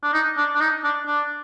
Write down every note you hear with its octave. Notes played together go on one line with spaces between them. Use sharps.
D4
D#4
D4
D4
D#4
D4
D4